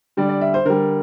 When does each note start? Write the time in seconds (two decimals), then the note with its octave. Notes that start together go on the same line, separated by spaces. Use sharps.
0.17 D3 G3 D5
0.29 D5
0.41 E5
0.54 C5
0.65 D3 G3 A#4